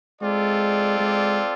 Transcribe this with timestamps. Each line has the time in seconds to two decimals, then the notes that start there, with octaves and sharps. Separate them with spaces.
0.21 G#3 C4 F4 A4 D5
1.00 G#3